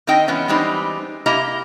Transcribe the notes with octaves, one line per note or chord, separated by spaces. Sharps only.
D#3 C4 D#4 D#5 G5
E3 G#3 B3 C#4
E3 G3 G#3 C4 D#4
C3 A#3 E4 G4 D#5 A#5